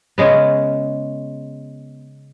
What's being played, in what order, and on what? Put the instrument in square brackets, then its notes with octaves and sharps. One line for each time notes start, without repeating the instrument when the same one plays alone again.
[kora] C#3 G#3 B3